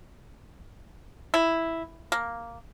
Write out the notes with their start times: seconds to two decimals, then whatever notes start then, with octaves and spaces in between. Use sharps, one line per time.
1.34 E4
2.12 A#3